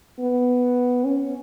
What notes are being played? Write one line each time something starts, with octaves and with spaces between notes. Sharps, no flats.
B3
C#4